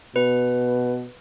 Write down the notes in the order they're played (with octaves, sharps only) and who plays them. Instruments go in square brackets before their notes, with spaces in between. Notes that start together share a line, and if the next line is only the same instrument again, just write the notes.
[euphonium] B2 [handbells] B4